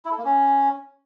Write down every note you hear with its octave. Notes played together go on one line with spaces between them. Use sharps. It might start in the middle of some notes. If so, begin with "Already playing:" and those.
E4
A4
A#3
C#4